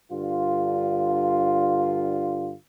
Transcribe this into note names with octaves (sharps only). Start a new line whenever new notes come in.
G2 D3 F4